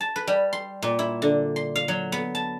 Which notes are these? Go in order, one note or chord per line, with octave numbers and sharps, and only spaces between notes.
A5
B4
G3
C6
A#2
E4
D3
C6
F5
F#3
B3
A5